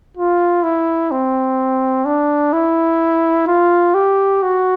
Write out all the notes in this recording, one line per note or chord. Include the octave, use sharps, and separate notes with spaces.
F4
E4
C4
D4
E4
F4
G4
F#4